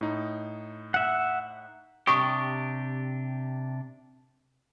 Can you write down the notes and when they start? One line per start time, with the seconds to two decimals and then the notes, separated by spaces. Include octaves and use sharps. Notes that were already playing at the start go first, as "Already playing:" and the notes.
0.01 A2 D#4
0.94 E5 F#5
2.07 C3 D4 G4 C#6 D#6